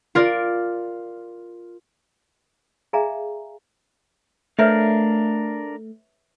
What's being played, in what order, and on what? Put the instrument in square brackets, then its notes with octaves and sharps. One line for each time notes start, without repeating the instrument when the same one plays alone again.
[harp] F4 A#4 D5
[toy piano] G#4 D5 E5 F5 G#5 A#5
[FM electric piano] A3 [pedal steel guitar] D4 A#4 F5 [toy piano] B4 C#5 E5